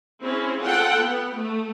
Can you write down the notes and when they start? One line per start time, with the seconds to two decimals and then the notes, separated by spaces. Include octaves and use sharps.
0.22 C4 C#4 E4 G#4
0.62 F4 A4 F#5 G5
1.00 B3
1.37 A3